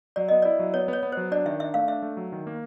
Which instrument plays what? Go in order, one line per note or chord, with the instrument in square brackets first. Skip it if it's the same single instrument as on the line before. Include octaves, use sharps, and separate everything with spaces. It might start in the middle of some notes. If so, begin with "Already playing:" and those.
[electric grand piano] F#3 [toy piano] D5
[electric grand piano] B3 [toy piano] D#5
[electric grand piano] E4 [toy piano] D5
[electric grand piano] F#3
[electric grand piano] B3 [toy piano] C#5
[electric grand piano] B3 [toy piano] C#5
[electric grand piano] B3
[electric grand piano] F#3 [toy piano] C5
[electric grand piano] D4 [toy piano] D5
[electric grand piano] D#3 [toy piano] E5
[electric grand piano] D4 [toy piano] E5
[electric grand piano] A3 [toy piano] F5
[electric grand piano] D4 [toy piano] E5
[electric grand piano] A3
F#3
D#3
A#3